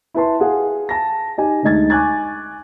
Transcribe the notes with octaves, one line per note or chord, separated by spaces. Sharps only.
E4 B4 A5 C6
G#4 F5 F#5
A5 A#6
D#4 G4 G#5
D2 G#3 D#4 G#6 A6
G#5 C#6 D6 F#6 G#6 A6